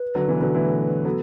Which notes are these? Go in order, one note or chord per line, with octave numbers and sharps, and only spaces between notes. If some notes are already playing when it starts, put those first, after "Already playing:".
Already playing: B4
D3 F#3
B2 E3
D3 F#3
E3 A3
F#3 B3 A4